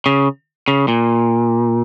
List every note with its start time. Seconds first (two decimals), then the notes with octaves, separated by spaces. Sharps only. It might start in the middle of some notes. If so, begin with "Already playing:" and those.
0.06 C#3
0.68 C#3
0.88 A#2